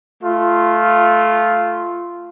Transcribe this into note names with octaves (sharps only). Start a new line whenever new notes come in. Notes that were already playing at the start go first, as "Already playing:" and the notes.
A3 F4